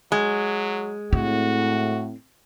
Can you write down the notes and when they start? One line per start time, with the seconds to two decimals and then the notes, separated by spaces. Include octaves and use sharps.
0.12 F#3 G#3
1.13 A2 C4 F#4